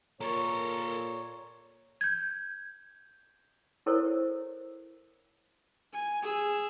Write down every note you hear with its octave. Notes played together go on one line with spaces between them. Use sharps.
A#2 A4 A#4 C#5 A#5 C#6
G6 G#6
E4 A4 A#4 C5 C#5
G#5
G#4 E6